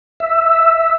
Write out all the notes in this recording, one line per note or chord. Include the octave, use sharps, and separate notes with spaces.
E5